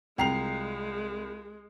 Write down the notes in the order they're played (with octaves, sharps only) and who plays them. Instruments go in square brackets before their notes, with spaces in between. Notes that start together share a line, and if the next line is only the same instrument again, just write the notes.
[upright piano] C2 C7 F7 [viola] G#3 [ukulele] F4 G5 A#5